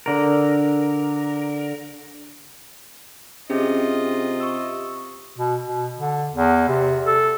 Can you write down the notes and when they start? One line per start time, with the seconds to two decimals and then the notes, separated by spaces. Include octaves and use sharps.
0.06 D3 A#4
3.50 C3 C#4 D4 F4 G#4 D#5
4.40 C#6 E6
5.37 B2
5.64 B2
5.98 D3
6.33 E2
6.68 C3
7.07 A4